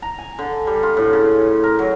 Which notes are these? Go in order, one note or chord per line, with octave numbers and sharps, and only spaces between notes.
A#5
G#5
D3
G3
F4
A2
C#3
A#4
F#3